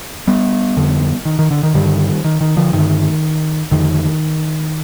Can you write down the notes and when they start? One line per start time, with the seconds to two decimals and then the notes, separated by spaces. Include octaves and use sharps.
0.27 G3 B3
0.77 F2 D3
1.25 D#3
1.39 D#3
1.51 D3
1.63 D#3
1.74 G2 D3 D#3 G3
2.24 D#3
2.41 D#3
2.57 D3 F3
2.73 G2 D3 D#3
3.71 F2 D3 D#3